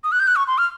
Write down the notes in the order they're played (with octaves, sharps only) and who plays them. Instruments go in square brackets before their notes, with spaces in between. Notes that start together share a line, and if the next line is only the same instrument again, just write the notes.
[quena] D#6
F#6
G6
F#6
C#6
C6
F6